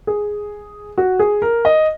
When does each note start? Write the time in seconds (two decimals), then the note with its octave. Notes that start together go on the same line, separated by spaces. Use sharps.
0.07 G#4
0.98 F#4
1.19 G#4
1.42 A#4
1.65 D#5